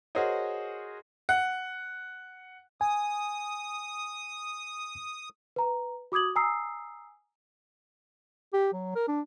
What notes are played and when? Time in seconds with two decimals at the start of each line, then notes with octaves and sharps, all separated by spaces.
0.15 F#4 G#4 A#4 C5 C#5 D#5
1.29 F#5
2.81 G#5 D#6
5.56 B4 A#5
6.12 F#4 D6 D#6 G#6 F#7
6.36 G#5 A#5 D#6 E6 C7
8.53 G4
8.73 F#3
8.95 A#4
9.08 D4